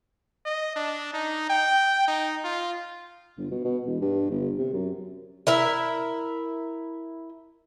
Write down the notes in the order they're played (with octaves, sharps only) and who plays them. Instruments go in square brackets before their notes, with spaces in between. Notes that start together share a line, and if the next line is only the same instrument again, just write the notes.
[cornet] D#5
D4
D#4
G5
D#4
F4
[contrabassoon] G1
B2
B2
E1
G2
G1
C3
F#2
[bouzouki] E4 A#4 E5